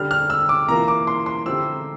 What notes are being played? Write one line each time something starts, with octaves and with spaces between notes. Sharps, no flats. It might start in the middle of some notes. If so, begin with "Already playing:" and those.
Already playing: D3 G3 D4 G4 F6
F6
E6
D6
E3 A#3 F4 A#5
D6
C6
C6
D3 F3 C4 E4 G4 E6